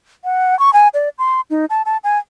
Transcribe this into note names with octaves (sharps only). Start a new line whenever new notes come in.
F#5
C#6
G#5
D5
C6
D#4
A5
A5
G#5